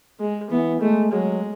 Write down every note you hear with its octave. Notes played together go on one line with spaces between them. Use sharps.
G#3
E3 B3
G#3 A3
F#3 G#3